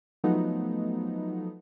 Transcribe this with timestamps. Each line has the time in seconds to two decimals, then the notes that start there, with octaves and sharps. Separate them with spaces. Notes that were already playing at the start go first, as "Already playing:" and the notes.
0.24 F3 F#3 A3 B3 D#4